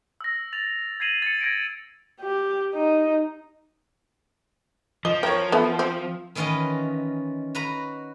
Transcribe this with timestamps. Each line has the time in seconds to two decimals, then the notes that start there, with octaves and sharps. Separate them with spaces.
0.21 E6 A#6
0.53 A6 F7
1.00 G#6 A#6 C7 D#7 F7 F#7
1.22 A6 C#7
1.41 G#6 A#6 D7
2.21 G4
2.75 D#4
5.05 F3 D#5 G7
5.23 A#4 C#5 G5
5.52 B3 A4 E5
5.79 C4
6.35 D#3 E3 C#4 F4 B4 D#5
7.55 F#4 B4 A#5